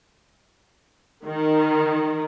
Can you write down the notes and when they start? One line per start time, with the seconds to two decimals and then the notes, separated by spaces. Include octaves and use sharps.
1.25 D#3